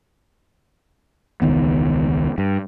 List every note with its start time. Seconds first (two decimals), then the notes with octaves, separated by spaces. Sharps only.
1.42 E1 C#2 D#3 B3
2.38 G2